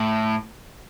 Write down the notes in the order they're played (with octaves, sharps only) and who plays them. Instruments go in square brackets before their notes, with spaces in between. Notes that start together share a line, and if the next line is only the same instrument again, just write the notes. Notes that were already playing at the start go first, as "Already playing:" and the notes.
Already playing: [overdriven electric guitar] A2